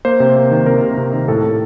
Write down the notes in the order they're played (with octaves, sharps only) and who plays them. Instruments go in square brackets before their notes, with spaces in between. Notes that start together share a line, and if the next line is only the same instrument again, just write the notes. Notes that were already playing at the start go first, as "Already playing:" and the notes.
[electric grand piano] A#3 C5
C3
A#3
D#3
C3 A#4
C3
C3
D#3
A2 A4
A2